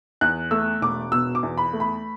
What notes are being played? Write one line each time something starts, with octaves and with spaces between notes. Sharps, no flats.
E2 F#6
A3 E6
E1 D6
B2 E6
D6
E2
B5
A3
B5